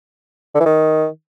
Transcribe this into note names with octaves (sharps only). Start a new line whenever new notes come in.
D3
E3
D#3